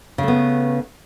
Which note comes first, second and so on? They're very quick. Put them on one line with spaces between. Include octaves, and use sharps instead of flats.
C#3 A3 B3